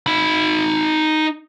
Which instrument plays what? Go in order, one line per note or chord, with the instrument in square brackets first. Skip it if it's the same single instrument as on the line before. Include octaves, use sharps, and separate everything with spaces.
[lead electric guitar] D#4 B5